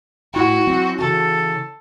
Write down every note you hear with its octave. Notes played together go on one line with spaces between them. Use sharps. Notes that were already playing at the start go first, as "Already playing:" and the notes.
A2 E4 F#4 G5
F#3 C4 E4
C#3 E3 F#4 A4